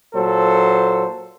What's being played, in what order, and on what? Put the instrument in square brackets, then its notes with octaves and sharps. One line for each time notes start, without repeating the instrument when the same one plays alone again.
[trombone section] A#2 F#3 A4 C5